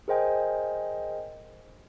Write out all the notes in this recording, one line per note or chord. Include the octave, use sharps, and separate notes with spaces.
G#4 A#4 C5 D#5 G5 G#5